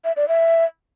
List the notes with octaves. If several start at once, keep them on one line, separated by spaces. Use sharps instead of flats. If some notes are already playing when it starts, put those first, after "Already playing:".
E5
D5
E5